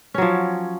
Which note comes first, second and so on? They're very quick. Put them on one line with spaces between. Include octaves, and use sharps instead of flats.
C#4 F#3 F3